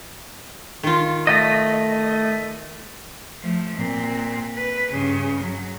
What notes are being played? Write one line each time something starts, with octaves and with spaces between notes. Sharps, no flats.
D#3 F4
A3 D#5
F3 A3
A#2 C4
B4
G2 C#3
F#3